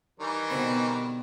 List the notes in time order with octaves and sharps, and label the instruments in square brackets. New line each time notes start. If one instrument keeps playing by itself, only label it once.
[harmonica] D#3 E3 G3
[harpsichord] B2 D3 C4